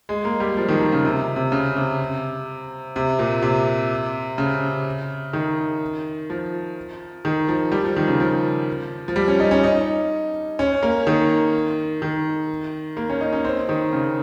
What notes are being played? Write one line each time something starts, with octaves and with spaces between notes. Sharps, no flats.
G#3
A#3
G3
F3
D#3
F3
C#3
C3
C3
C#3
C3
C3
A#2
C3
C#3
D#3
F3
D#3
F3
G3
F3
D#3
C#3
F3
F3
G3
C#4
D#4
C#4
D#4
C#4
A#3
D#3
D#3
A#3
C#4
D#4
C#4
C4
D#3
C#3